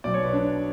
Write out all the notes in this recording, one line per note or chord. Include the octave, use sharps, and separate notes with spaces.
B1 B2 D5
C#5
B4
D4